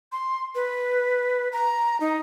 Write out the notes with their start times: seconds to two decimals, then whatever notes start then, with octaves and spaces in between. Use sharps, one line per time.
0.12 C6
0.55 B4
1.53 A#5
2.00 D#4